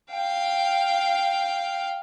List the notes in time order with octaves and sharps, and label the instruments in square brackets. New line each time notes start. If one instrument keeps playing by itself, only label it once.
[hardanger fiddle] F5 G5